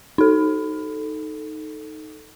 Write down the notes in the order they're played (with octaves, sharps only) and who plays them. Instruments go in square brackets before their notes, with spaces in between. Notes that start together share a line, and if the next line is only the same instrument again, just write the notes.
[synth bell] D#4 A4